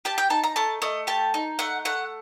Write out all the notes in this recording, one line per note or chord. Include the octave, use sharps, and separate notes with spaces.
G4 A5
G5
D#4 A5
A#5
A3 A5
A3 D#5
G4 A5
D#4
A3 F#5
A3 F#5